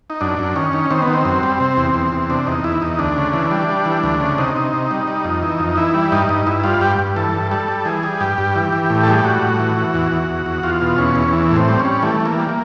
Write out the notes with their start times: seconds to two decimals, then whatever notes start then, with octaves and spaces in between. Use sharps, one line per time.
0.10 D#4
0.21 F#2 D4
0.39 F#2
0.56 D#3 C#4
0.73 D#3
0.91 D#3 C4
1.02 B3
1.07 D#3
1.14 C4
1.25 F#2
1.43 G3
1.60 C3
1.77 E2
1.95 E2
2.12 E2
2.30 C3 D4
2.46 E2 D#4
2.64 E2 E4
2.82 E2 D#4
2.99 D2 D4
3.17 C#3
3.33 E3
3.51 G3
3.69 G3
3.86 E3
4.03 D2
4.21 C#3
4.38 C3 D#4
4.56 C3
4.73 C3
4.91 G3
5.07 G3
5.24 F2
5.43 E3
5.60 F2
5.77 E3 E4
5.94 G3
6.12 G2 D#4
6.29 G2
6.46 G2 E4
6.64 G3 F4
6.81 G2 G4
6.99 G2
7.16 E3 A4
7.33 G2
7.51 G3 A4
7.68 G3
7.85 E3 G#4
8.03 G3
8.20 G2 G4
8.38 G2
8.55 E3
8.72 E3
8.90 A2
9.03 A4
9.07 G3 G#4
9.18 G4
9.25 A2 F#4
9.42 A2
9.60 E3
9.77 E3
9.94 E2
10.12 E2
10.29 E2
10.46 E2
10.63 E2 F4
10.81 B2
10.98 E2 C#4
11.16 E2
11.33 E3
11.50 A2
11.56 C4
11.68 G3
11.79 C#4
11.85 G3
12.02 E3 A3
12.20 E3
12.26 A#3
12.38 G3
12.49 A#3